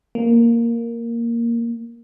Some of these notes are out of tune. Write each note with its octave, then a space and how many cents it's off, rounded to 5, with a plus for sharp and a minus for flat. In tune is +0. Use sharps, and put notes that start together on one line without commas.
A#3 +0